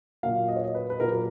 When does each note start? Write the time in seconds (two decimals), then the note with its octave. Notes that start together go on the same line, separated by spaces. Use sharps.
0.23 A#2 F#3 A#3 F5
0.48 D#5
0.56 C#5
0.64 D#5
0.75 B4
0.90 B4
1.00 A#2 F#3 A#3 A#4
1.12 A#4